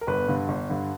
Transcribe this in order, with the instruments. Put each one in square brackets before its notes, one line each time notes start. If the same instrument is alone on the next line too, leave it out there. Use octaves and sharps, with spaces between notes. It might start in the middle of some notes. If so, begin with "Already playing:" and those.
[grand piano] A#4
G1 B3 B4
G2 D3
G1
G2 D3